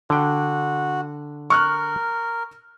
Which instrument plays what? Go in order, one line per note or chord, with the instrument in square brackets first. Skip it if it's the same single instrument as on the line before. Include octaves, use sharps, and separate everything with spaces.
[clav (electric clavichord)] D3 G5 [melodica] F#4
[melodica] A#4 [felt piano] C#6 F6 F#6